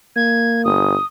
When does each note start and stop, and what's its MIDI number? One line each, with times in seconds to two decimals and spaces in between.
0.16 0.72 58
0.16 0.62 92
0.65 0.95 31
0.65 1.06 87